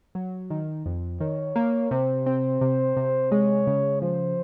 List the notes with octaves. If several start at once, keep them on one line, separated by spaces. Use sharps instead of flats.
F#3
D#3
F2
D#3 C#5
A#3
C3 C5
C4
C3
C3
G#3 C#5
C#3
F3 C5